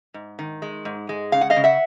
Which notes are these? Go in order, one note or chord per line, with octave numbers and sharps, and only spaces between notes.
G#2
D#3
G#3
G#2
G#3
C#3 F5
F#5
D#5 F5
C#3
E5 F#5